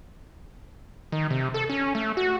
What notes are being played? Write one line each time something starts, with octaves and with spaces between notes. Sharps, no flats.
D#3
C3
A4
C#4
A3
F#4